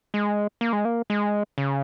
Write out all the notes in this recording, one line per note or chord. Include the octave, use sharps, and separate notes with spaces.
G#3
A#3
G#3
A#3
G#3
C#3